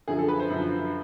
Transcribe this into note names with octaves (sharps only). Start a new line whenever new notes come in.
F#2 D3 F3 G#4
A4
B4
C5
F#2 D3 F3